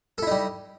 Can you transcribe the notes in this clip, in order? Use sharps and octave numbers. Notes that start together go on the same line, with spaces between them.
G3 D#4 E4 A4